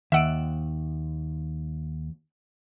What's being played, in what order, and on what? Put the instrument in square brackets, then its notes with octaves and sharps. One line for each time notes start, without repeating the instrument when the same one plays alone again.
[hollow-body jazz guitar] D#2 [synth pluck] D#3 E6 [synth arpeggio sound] E5 F#5 D7